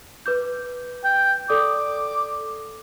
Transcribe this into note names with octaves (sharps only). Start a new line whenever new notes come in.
B4 D6 G6
G5
A4 D5 D6 D#6